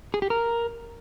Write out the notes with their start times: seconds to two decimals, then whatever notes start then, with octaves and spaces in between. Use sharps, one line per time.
0.14 G#4
0.22 G4
0.30 A#4